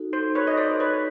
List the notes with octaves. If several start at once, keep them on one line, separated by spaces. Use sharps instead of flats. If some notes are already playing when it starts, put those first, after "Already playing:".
Already playing: D#4 F#4 A4
C5
B4 C#5
D#5
C5 D5
B4 C#5